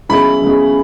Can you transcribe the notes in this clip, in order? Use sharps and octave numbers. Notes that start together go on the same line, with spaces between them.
C#3 F#3 B3 E4 G#4 B5
C#3 F#3 B3 E4 G#4